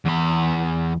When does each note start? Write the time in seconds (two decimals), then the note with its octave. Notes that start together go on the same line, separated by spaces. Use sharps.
0.05 E2 B5